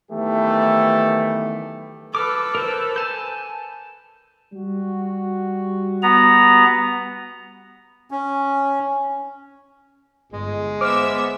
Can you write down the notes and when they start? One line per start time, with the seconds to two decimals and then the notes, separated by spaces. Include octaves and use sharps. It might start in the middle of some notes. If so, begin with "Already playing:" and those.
0.11 D#3 E3 F#3 A3 B3 G4
2.15 A4 B4 D6 F6
2.55 A#4 C5
2.96 G#5 A5 G6
4.52 G3 F#4
6.03 B3 A#5
8.11 C#4
10.33 G1 G#3
10.81 B3 C5 E5 D6 E6 F6